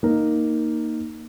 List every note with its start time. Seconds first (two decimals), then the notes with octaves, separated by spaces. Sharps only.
0.03 A#3 D#4 A#4